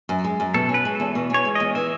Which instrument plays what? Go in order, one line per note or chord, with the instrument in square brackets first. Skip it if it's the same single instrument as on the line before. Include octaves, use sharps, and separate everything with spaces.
[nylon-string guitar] F#2
G#3
F#2
[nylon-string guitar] B2 [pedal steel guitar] A4
[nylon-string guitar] C#4
[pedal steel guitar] B4
[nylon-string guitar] G#3
[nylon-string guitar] E2 [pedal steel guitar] A4
[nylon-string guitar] B2
[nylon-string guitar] C#4 [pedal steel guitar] C#5
[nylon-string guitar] G#3
[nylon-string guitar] E2 [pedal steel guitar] D#5
[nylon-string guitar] E3 [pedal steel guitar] E5